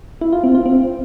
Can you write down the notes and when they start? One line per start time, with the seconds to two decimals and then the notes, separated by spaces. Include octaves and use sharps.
0.21 E4
0.33 F4
0.44 C4
0.55 F4
0.66 C4